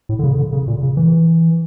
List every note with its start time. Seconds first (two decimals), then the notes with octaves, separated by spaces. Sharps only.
0.09 A2
0.19 D3
0.24 C#3
0.38 D3
0.53 C#3
0.68 A#2
0.83 C#3
0.97 E3